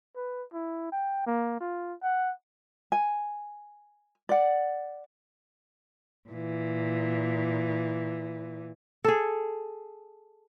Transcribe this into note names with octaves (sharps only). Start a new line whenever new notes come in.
B4
E4
G5
A#3
F4
F#5
G#5
D5 F#5
A#2 E3
G#4 A4